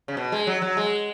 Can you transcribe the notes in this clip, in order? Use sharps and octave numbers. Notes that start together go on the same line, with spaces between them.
C#3
B2
G#3
F#3
F#3
G#3